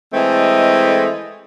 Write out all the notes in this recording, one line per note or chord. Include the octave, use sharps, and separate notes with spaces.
E3 G#3 A3 C4 A4 D#5